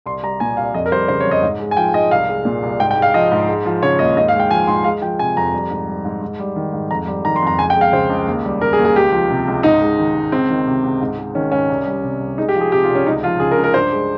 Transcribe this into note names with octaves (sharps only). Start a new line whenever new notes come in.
C2 C6
G3 A#5
A#2 G#5
C2 F5
F2 D#5
A#4
G3 C5
C#3 C5
C#5
F2
D#5
G#2
G#3
G#5
F3 G5
G#2 D#5
C2 F5
G#3
A#2
C2
G#2 G5
G5
G#3
F5
F3 D#5
G#2
G#3
F3
C#3 C#5
D#2 D#5
G#2 D#5
F5
G#3
G5
F3 G#5
G#2 C6
G#3 F5
F3 G5
C3 G#5
F2 A#5
G3
G#2
G3
G#2
G#2
G3
D#3
G#2
F2 A#5
G3
D#3 A#5
C6
F2 A#5
C#2 G#5
G5
G#3 F5
C#3 C5
C#2
D#2
G3
C#3 A#4
G#4
D#2
G#4
C#2 G4
F3
C3
C#2
G#2 D#4
G#3
D#3
G#2
C#2 C4
D#3
C3
C#2
G#2
G#3
D#3 C#4
G#2 C#4
C2
G3
C3
C2
G#3 D#4
G4
F3
G#4
C3 G4
F4
C2
C#4
C#2 D#4
F3 F4
C#3 G#4
A#4
C#2
A#4
G2 C5
G#3